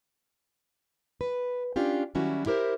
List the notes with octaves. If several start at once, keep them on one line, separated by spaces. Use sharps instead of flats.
B4
C#4 D4 F4 G4
D#3 F#3 G3 C#4 E4 F#4
E4 G4 A#4 C5